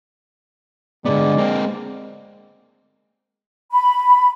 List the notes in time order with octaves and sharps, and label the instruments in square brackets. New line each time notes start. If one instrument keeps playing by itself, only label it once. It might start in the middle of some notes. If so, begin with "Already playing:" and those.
[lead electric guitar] D3 B3 [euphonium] G#3 [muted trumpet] D5
[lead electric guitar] A#3 C4
[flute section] B5